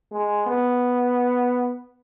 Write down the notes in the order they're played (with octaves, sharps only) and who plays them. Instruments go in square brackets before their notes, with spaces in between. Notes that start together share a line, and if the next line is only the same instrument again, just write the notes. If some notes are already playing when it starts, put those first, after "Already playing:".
[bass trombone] G#3
B3